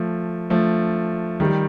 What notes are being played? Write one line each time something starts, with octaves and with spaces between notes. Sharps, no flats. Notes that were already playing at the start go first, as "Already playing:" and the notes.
Already playing: F3 A3
F3 A3
D#3 G3